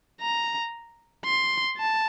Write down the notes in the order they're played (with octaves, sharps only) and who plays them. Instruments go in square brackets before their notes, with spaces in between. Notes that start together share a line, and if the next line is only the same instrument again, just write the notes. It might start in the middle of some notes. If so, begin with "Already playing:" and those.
[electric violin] A#5
C6
A5